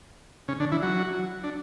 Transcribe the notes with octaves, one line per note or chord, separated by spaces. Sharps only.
C#3 C#4
D3 D4
E3 E4
F#3 F#4
D4